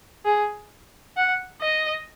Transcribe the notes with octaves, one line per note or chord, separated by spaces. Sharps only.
G#4
F#5
D#5